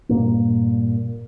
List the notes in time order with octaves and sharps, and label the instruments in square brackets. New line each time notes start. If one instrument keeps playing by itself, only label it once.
[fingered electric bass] G2 A#2 A#3